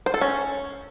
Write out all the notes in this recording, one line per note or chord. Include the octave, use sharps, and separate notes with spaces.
C5
A4
C#4